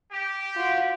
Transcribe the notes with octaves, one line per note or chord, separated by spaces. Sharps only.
G4
F4 F#4